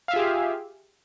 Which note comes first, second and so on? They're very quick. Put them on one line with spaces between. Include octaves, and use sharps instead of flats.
F5 E5 F4 G#4 G4